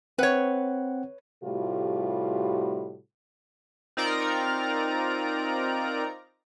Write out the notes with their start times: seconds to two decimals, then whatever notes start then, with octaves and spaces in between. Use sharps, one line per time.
0.18 C4 B4 C#5 F#5
1.44 A2 C3 G3 A3 F4 F#4
3.97 C4 D#4 F4 A#4 D5 A#5